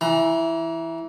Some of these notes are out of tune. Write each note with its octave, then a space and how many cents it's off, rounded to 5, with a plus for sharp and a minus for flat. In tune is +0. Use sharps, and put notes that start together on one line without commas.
E3 +0 A#5 +30